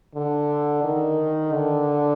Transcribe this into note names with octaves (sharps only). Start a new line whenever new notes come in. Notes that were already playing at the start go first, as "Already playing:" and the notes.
D3
D#3
D3